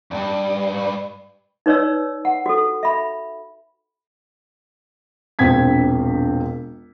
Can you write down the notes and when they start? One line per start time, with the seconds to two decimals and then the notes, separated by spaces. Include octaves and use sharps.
0.11 E2 G2
1.66 D#4 B4 C#5 D5 E6
2.25 F#5
2.46 F#4 A4
2.83 E5 B5
5.39 E1 A#1 C4 G#6 B6